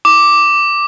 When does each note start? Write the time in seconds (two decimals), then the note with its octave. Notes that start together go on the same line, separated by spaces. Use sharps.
0.05 D6